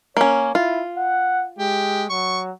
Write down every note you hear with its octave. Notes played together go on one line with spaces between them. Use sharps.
A#3 C#4 C#5
E4 F4
F#5
G#3 G4
F#3 C#6